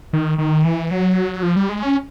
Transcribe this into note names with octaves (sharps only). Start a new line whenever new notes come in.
D#3
D#3
E3
F#3
F3
G3
G#3
C#4